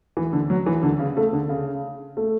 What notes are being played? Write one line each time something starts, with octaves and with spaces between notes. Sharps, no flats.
E3
D3
F#3
E3
D3
C#3
A3
D3
C#3
A3